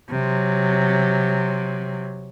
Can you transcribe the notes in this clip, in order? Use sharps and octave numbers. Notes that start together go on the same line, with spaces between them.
C3 F#3